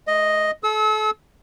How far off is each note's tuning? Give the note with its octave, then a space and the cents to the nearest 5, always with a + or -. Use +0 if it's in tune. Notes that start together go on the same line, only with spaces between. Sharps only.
A3 -30 D#5 +0
A4 -35 E6 -40